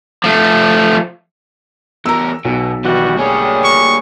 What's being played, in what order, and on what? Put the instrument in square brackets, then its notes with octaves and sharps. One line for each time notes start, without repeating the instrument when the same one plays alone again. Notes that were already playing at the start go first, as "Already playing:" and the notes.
[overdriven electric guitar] F3 A3
[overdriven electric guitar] E2 A#4 [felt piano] A#5 E6
[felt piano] B1 [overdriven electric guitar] B2
[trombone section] B2 G3 F#4 [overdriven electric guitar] D#3 E3
[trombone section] D2 G3 G#4 [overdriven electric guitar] A#3 C#5
[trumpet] C#6